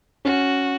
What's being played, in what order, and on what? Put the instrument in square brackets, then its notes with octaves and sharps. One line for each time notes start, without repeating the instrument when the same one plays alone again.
[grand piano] C#4 [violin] F#4